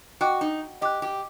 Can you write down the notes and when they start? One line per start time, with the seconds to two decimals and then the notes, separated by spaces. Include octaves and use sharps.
0.21 F#4 D#5 G5 D6 F#6
0.41 D#4
0.81 G4 D#5 G5 D6 F#6
1.02 G4